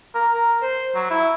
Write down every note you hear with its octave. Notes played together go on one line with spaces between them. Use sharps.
A#4
A#4
C5
F#3
E4